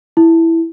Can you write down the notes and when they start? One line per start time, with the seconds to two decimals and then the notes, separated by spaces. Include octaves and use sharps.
0.17 E4